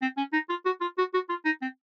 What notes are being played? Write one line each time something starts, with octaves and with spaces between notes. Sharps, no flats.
C4
C#4
D#4
F4
F#4
F4
F#4
F#4
F4
D#4
C4